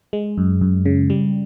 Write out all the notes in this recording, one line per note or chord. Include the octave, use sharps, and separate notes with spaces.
G#3
F#2
F#2
C#3
G3